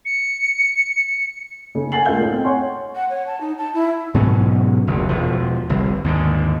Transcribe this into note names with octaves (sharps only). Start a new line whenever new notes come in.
C#7
C#3 A3 A#3 D#4
F#5 G#5 A6 C7 F#7
C#2 A3 A#4 F5 G6 G7
A2 D#4
C4
C#5 F#5 G#5 C6 C#6
F#5
C#5
A5
D#4
A5
E4
G#2 B2 F#3 C#4
F#1 D2
E1 F3
G1 C2
D#2 G#2 D3